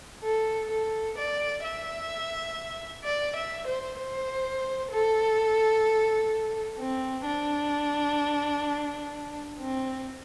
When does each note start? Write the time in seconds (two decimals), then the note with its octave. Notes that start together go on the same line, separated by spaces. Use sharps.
0.23 A4
0.70 A4
1.18 D5
1.64 E5
3.04 D5
3.36 E5
3.67 C5
3.98 C5
4.91 A4
6.78 C4
7.25 D4
9.59 C4